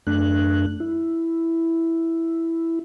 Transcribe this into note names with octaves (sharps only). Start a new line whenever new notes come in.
F#2 A3 D4 F#6
E4